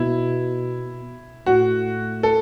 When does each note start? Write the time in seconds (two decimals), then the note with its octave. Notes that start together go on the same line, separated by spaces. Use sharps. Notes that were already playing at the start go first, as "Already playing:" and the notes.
Already playing: B2 E4
1.46 A2 F#4
2.23 A4